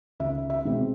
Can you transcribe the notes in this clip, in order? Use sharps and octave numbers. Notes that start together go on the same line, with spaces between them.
C#2 E5
E5
B2 G#3 C4